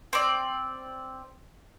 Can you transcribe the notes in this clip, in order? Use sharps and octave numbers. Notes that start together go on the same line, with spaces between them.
C4 D5